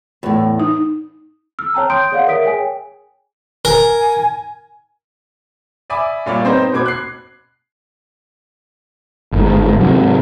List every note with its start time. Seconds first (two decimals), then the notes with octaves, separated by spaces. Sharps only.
0.23 E2 A2
0.60 D#4
1.59 E6 F6
1.74 C#5 G5 A5 A#5
1.90 C6 D#6 G6 D7
2.12 G#4 C#5 D5 F5 F#5
2.27 A#4 E5 D#6 B6 D7
2.44 G#4 C#5 G5 G#5
3.65 A#4 G#5
5.90 D5 E5 G#5 B5 D6 D#6
6.26 G2 A#2 F4 C#5 D5 B5
6.44 B3 C4 D#4 C5
6.72 B2 C5 B5 D6 G#6
6.86 F#6 C7
9.32 G1 G#2
9.80 G#2 C3 F#3